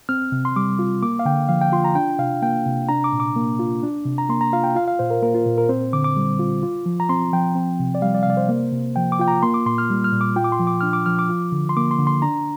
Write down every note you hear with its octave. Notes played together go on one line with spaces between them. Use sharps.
C4 F6
C3
C6
G3 D6
F4
A#3 D6
F5
D3 G5
F3 F5
G5
F4 C6
A#5
D4 G5
C3 F5
A#3 G5
C3
D4 A#5
D6
A#2
D6
A#3
F4
D4
C3
A#5
A#3 C6
A#5
F4 F5
G5
F4 F5
F5
A#2 C5
A#4
A#3 A#4
F4
A#2
A#4
C4 C5
D3 D6
D6
G3
F4
F4
F3
A#5
C4 C6
F3 G5
C4
C3
D5
G3 F5
D5
F5
C3 D5
C5
A#3
C3
F3 G5
D6
F4 G5
A#5
A#3 C6
D6
A#2 C6
F6
G3
F6
A#2
D6
F4 G5
D6
C6
F3
D6
D4 F6
D6
F3 F6
D6
F4
D3
C6
A#3 D6
C6
D3
C6
D4 A#5